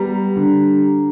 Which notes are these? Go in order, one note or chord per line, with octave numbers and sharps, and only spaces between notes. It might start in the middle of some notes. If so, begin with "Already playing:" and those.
Already playing: G3 B3 A#5
D3